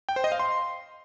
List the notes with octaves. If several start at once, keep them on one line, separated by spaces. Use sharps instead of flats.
G5
C5
D#5
F5
C6